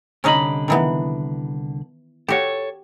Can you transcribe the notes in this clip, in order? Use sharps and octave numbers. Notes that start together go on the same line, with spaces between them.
C2 D3 C#4 D#4 D#5 B5
D#3 E3 B3
F#4 G4 A4 C#5